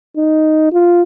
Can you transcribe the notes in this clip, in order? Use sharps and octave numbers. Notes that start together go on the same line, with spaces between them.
D#4
F4